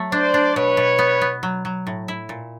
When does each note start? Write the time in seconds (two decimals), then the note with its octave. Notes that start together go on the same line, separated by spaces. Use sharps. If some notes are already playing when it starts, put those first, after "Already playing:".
Already playing: F#3 A3
0.12 D4 C5 D5
0.34 D4
0.55 B2 B4 C#5
0.77 B2
0.99 B3
1.21 B3
1.43 F#3
1.65 F#3
1.87 A2
2.08 E4
2.29 A#2